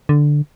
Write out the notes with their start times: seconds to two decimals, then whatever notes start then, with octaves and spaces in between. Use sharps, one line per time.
0.09 D3